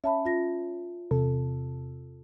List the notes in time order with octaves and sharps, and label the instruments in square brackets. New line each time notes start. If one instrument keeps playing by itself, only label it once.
[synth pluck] C#4 [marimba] E5 A5 B5
[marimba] F4 A#6
[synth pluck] E2 C3 A4